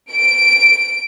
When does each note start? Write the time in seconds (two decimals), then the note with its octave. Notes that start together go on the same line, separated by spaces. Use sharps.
0.12 D7